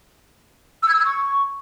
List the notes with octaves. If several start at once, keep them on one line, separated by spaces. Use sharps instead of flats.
E6
G#6
E6
G#6
C#6